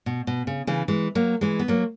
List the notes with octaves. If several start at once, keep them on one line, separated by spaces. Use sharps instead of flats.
B2
B2
C#3
C#3 E3
E3 G#3
F#3 A#3
E3 G#3
B3
F#3 A#3